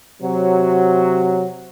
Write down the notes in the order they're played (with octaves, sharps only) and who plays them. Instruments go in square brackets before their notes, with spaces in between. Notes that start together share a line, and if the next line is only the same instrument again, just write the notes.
[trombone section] C3 F#3